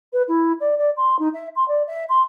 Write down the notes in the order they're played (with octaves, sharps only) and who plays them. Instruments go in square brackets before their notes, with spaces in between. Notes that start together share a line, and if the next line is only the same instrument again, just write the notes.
[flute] B4
E4
D5
D5
C6
D#4
E5
C6
D5
E5
C6